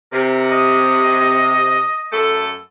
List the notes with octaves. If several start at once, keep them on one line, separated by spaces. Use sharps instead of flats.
C3 A#4
D#5
F#2 A3 A4